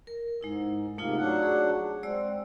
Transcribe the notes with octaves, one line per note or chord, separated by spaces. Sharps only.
A#4
G#2 G#3 D#4 E4
G#2 C3 A3 A#3 D#4 F4
F#3 D4 F#5
G#4
G#3 C4 D5 E6